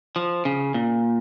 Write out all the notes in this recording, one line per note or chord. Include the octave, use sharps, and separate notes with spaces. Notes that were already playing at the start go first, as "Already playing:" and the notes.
F3
C#3
A#2